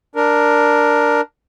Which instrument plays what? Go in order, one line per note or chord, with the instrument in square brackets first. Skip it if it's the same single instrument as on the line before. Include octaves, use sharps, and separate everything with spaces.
[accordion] D4 A#4